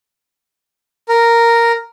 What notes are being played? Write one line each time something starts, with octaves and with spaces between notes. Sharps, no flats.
A#4